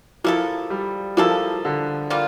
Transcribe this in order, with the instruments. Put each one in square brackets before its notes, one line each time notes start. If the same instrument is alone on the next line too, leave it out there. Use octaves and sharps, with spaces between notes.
[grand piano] F3 [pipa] A#3 E4 A4
[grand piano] G3
[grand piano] F3 [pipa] A#3 E4 A4
[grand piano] D3
[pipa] G3 A#3 F4